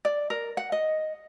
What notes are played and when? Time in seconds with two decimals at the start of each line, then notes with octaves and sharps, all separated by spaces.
0.05 D5
0.30 A#4
0.57 F#5
0.72 D#5